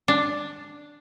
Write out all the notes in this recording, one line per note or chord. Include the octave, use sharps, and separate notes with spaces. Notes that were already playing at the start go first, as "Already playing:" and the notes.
D4